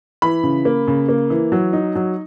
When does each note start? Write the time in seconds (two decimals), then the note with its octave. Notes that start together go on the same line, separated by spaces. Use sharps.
0.22 E3 B5
0.43 C#3
0.65 A#3
0.87 C#3
1.09 A#3
1.30 E3
1.52 F#3
1.73 D#4
1.95 F#3